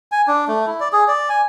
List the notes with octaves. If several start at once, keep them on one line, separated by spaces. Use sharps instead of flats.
G#5
D4
A3
E4
D5
G#4
D5
G#5